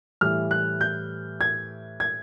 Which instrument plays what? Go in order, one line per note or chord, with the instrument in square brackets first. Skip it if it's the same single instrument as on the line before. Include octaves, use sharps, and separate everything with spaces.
[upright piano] A2 E3 G3 F6
F#6
G6
G#6
G#6